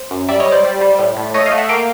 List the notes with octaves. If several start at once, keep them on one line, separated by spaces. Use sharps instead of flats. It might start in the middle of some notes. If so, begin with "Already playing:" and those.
Already playing: C5
F#2
G3 D5 E5
C#5 D#5
G3
C5 D5
G3
G3
A2
A2
A3 C#5 D#5
D#5 F5
A3
E5 F#5
A#3 F5 G5